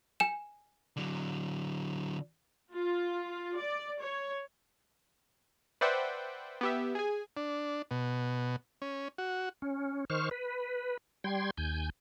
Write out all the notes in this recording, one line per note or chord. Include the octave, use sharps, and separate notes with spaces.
G#5 E7
D3 F#3
F4
D5
C#5
B4 C5 D5 E5 F#5 G5
B3 G4 E5
G#4 G#5
D4
B2
C#4
F#4
C#4
D#3 C5 C#6 F6
B4
G3 G5 C6 G#6
D#2 G#5 G6